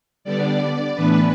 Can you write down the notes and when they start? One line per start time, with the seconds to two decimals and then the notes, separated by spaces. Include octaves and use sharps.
0.24 D3 G3 B3 D4 D5
0.95 A2 E3 B3 D4 B4